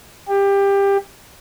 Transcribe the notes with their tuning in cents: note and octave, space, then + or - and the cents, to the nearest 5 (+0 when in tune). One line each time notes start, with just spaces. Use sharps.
G4 +20